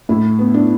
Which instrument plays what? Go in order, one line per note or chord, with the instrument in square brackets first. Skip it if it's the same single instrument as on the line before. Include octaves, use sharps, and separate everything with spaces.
[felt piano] A2 E4
B3
D4